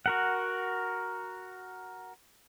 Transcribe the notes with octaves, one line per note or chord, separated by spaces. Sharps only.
F#4 A#4 F#5